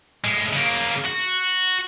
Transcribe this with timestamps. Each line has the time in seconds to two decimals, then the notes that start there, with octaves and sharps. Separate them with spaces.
0.24 A2 G#3
0.53 C#3 A#3
1.05 F#4